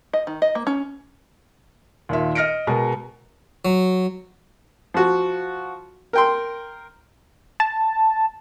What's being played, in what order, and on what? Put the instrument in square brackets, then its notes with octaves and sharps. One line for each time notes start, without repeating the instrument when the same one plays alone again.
[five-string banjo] D#5
D#3
D#5
A#3
C#4
[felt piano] D#2 A#2 E5
D#5 F6 A#6 C#7 D7
B2 G#3 A#4
[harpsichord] F#3
[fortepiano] F3 F#4
A#4 G5 C6
[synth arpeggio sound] A5